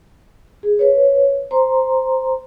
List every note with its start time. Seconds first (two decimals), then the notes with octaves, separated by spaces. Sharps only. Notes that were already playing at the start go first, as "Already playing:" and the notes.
0.63 G#4
0.79 B4 C#5
1.51 C5 A#5 C6